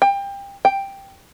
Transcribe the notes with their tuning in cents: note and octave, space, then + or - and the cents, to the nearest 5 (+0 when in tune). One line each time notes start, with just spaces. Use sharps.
G5 +25
G5 +5